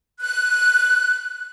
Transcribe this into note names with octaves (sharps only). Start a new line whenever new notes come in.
F#6